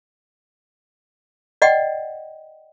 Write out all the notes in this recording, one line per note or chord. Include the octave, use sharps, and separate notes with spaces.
D5 D#5 F#5 G5